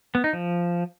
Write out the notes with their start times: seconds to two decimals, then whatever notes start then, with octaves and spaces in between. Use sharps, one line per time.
0.15 B3
0.24 D#4
0.33 F3